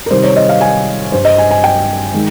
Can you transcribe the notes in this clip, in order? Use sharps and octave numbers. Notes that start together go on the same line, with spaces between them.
A#4
C3 D#3 G3 C5
C#5
D#5
F5
G#5
G2 G3 C5
D#5
G#5
G#5
G5
D#3 G#3